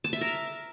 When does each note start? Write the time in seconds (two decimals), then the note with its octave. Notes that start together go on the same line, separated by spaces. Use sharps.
0.04 A5
0.13 E5
0.21 A#4